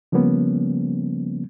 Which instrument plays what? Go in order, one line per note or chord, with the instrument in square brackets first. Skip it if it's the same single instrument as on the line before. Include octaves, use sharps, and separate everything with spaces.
[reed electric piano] C#3 F3 G3 A#3 B3 C#4